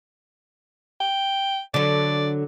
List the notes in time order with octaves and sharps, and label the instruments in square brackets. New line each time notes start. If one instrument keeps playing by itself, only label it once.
[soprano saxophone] G5
[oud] D3 F#3 [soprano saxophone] D5